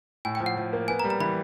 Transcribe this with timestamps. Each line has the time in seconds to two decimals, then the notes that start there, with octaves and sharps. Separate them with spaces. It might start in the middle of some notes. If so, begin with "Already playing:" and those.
0.25 A2 G#5
0.35 G5
0.40 F3
0.46 F#5
0.57 F3
0.73 A#3
0.88 B3 G#5
1.00 A#5
1.04 G3
1.10 A#5
1.20 E3 B5